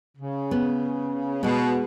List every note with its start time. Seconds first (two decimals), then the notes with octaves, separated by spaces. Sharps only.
0.18 C#3
0.51 B3
1.43 B2 G#3 B3